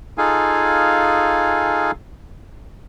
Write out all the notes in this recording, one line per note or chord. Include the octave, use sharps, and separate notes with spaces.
D#4 F4 G#4 A4 F5 G#5